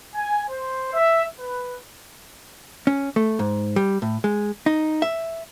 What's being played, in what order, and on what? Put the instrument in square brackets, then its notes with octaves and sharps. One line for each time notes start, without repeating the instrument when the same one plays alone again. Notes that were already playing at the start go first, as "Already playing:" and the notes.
[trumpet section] G#5
C5
E5
B4
[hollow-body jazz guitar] C#4
A3
G#2
G3
A2
G#3
D#4
E5